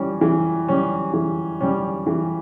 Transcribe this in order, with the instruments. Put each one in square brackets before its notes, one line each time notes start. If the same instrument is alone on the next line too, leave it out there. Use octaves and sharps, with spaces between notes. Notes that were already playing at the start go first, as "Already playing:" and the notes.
Already playing: [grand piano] E3 G3 C#4
E3
G3 C#4
E3
G3 C#4
E3